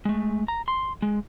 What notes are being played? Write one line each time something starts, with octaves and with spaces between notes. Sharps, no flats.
G#3 A3
A#5
C6
G#3